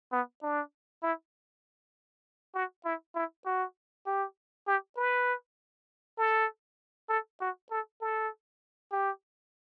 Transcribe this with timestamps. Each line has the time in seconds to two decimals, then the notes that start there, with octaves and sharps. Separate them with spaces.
0.12 B3
0.43 D4
1.03 E4
2.55 F#4
2.85 E4
3.15 E4
3.46 F#4
4.06 G4
4.67 G4
4.97 B4
6.18 A4
7.09 A4
7.40 F#4
7.71 A4
8.01 A4
8.92 G4